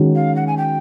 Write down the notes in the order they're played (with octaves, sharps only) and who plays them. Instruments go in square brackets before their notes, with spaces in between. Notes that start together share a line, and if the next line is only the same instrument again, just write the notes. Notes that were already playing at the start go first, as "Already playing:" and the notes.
Already playing: [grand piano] D#3 G#3 C#4 F#4
[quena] F5
F#5
G#5
G5